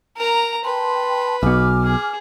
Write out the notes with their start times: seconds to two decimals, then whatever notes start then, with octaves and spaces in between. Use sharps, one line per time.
0.17 A#4 A#5
0.64 B4 G5 A5 C6
1.43 B1 B2 G#5 D6 F6
1.84 G#4